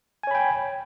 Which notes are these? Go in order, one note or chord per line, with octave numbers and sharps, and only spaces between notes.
C#5 G5 G#5 B5